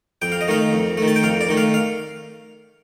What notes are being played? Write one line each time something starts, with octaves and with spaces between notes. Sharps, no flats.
F2 G5
F5
D#5
D#3 A3 F5
F2
D#3 A3
A5
G5
F2 F5
D5
D#3 A3
F5
F5